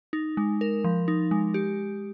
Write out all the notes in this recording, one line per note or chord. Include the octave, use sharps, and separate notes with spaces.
D#4
G#3
A#4
F3
D#4
G#3
G4